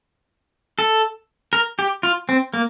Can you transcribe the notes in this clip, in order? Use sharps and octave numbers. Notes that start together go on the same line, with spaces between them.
A4
A#4
G4
F4
C4
A#3